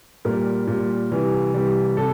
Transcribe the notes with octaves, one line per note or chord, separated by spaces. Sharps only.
A#2 G3 A#4
A#2 G3
C3 E3 G3
C3 E3 G3
C3 A4